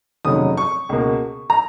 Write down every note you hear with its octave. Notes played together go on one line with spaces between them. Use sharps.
F1 D#2 C#3 F#3 D#6
C#6
C#2 B2 A#3
A#5